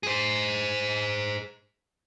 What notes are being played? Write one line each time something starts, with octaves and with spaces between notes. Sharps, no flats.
G#4 C5